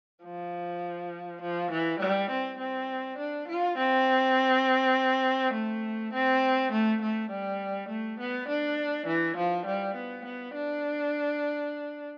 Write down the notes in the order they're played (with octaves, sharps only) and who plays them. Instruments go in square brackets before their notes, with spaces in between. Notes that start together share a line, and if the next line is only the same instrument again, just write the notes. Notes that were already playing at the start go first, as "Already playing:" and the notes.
[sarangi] F3
F3
E3
G3
C4
C4
D4
F4
C4
A3
C4
A3
A3
G3
A3
B3
D4
E3
F3
G3
B3
B3
D4